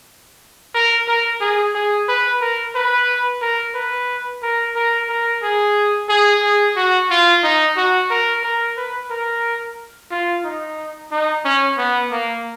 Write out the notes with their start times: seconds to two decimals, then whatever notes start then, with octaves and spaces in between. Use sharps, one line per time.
0.75 A#4
1.08 A#4
1.41 G#4
1.75 G#4
2.08 B4
2.41 A#4
2.75 B4
3.42 A#4
3.75 B4
4.43 A#4
4.76 A#4
5.09 A#4
5.43 G#4
6.09 G#4
6.43 G#4
6.76 F#4
7.10 F4
7.44 D#4
7.77 F#4
8.10 A#4
8.43 A#4
8.77 B4
9.11 A#4
10.11 F4
10.45 D#4
11.12 D#4
11.45 C#4
11.78 B3
12.12 A#3